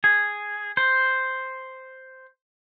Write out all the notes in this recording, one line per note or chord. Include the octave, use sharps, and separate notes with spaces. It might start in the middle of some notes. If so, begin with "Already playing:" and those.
G#4
C5